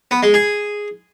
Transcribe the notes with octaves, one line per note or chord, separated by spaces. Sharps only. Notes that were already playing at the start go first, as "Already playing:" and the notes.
B3
G#3
G#4